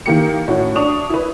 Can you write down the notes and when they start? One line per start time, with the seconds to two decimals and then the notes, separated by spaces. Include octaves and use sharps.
0.06 D#3 E3 A#3 G4 C#7
0.48 A2 C#4 F#4
0.75 D4 C#6 D#6 F7
1.10 E4 B4